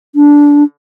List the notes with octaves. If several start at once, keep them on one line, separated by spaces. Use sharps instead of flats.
D4